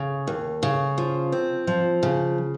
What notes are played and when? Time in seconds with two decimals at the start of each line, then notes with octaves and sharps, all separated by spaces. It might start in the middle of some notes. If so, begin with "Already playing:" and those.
Already playing: C#3
0.27 D#2
0.63 C#3
0.98 F3
1.32 C4
1.67 F3
2.03 C#3